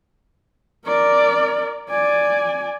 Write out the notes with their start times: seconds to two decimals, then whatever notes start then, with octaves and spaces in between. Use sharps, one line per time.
0.86 A#4 D5
1.90 D5 G#5